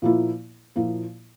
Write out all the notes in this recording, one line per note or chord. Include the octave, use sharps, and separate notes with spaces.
A#2 F3 A#3 E4
A#2 F3 A#3 E4